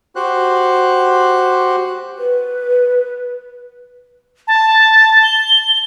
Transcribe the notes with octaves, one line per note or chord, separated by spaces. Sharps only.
F#4 G4 C5 F#6
B4
A5
G7